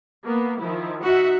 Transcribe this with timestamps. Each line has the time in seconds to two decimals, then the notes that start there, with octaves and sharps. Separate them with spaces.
0.24 A#3 B3
0.59 D#3 F3 E4
1.03 D#4 F#4 E5 F#5